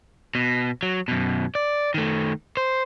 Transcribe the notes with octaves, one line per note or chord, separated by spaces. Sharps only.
B2
F#3
F#2 B2
D5
D#3 A3
C5